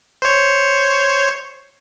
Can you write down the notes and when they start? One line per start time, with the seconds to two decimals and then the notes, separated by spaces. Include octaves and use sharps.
0.22 C5 C#5